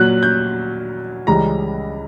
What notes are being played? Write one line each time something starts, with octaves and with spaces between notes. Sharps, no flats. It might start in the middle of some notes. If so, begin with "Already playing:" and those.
Already playing: A#2 F#3 F#6
G6
C#2 C#3 E3 G3 A#5